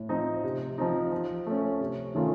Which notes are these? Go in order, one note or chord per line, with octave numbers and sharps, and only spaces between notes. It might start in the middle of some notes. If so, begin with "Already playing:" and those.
Already playing: A2
F3 C4 D#4
C3
F3 C4 D#4
F3
A3 C#4
C3
D#3 A3 C#4 F4